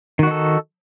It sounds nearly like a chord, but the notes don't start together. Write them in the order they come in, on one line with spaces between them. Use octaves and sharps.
D#3 F#4 D#4 A4